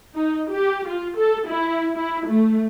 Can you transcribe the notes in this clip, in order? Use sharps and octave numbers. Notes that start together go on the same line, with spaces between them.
D#4
G4
F4
A4
E4
E4
A3